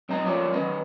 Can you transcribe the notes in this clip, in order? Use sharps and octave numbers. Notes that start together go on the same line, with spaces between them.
B1 C4 D#5 A#5
F3 A#3 C#4 F4 D5
D#3 C#4 B4 D#5